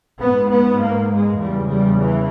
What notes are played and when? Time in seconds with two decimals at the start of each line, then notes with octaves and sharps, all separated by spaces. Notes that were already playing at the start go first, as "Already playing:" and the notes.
0.21 G#2 B3
0.52 B3
0.82 A#3
1.12 G#3
1.41 E2 C#3 G3
1.71 G3
2.01 E3